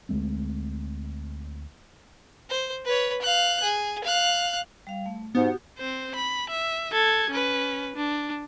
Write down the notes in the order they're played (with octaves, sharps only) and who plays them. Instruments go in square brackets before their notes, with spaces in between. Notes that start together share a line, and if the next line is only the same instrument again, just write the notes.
[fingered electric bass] D2 G#3 A3 C4
[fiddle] C5
B4 C#5
F5 F#6
G#4
F5 F#6
[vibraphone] G3 F5
A3
[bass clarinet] G#2 [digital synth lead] B3 [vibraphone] F#4 G4
[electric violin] C4 C5
B5
E5
A4 G#6
C#4 B4
D4